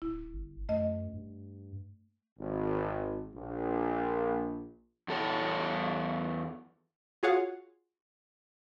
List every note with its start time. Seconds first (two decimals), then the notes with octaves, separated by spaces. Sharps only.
0.02 D1 E4
0.33 G1
0.69 F#2 A3 D#5
1.13 G2
2.38 G#1
3.34 A#1
5.08 E2 A4 C#5
7.23 F4 F#4 G#4 C#5 F5 F#5